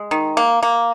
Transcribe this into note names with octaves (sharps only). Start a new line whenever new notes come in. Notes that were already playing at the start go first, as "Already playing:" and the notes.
Already playing: G#3
D#3
A#3
A#3